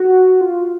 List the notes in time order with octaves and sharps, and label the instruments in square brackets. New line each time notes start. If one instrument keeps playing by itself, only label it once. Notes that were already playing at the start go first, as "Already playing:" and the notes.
Already playing: [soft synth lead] F#4
F4